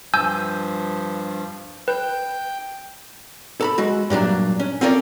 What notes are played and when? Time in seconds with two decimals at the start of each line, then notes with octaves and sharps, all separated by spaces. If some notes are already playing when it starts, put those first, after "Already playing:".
0.14 G2 F3 G#5 E6 G6
1.88 B4 G5 G6
3.61 A4 A#5 B5
3.78 G#3 F#4
4.10 G2 A#2 F#3 D4
4.60 C#4
4.81 C4 C#4 F4 A4 A#4 D5